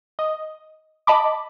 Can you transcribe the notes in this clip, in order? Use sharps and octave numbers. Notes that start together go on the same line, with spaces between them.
D#5
D#5 A5 B5 D6